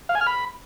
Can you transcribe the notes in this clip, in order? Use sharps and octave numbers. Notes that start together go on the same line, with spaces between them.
F5
G#5
F6
B5